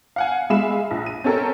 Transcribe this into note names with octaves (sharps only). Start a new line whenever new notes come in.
F5 F#5 G#5
G#3 E5 F5 B5 E7
A#1
D#7
C4 C#4 A4 A#4 C#5